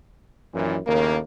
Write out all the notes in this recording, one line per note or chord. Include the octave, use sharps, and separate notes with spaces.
F#2 A#2 D#3 E3
D#2 A2 C#3 A#3